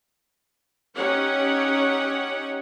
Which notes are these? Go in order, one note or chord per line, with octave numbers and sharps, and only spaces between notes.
C#4 D#4 G4 C#5 F#5